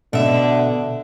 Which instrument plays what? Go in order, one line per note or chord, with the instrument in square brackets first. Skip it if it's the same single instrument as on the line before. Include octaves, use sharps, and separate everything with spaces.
[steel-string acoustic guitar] B2 E5 [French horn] D3